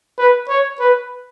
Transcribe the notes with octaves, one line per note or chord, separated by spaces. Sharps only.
B4
C#5
B4